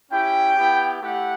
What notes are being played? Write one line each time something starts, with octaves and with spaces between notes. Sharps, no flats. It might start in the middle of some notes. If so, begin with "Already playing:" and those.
C#4 E4 G4 G5
B3 E4 G4
A3 E4 G4 F#5